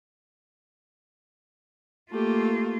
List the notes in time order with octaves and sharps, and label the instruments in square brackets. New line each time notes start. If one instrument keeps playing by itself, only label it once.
[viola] A3 G4 [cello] A#3 F4